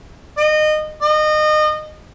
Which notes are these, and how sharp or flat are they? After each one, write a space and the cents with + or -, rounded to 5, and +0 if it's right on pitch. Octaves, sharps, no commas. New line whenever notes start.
D#5 -25
D#5 -30